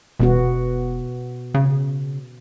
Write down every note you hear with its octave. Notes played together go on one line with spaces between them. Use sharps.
E1 B2 B3 F#4
C#3